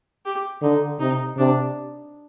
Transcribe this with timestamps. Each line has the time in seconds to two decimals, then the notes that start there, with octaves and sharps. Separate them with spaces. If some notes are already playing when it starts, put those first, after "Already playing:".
0.26 G4
0.62 D3 D#4
1.00 C3 D#4
1.38 C3 D4